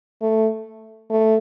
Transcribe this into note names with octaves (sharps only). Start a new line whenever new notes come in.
A3
A3